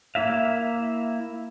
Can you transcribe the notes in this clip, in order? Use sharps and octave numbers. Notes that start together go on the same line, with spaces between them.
A#3 E4 E5 F5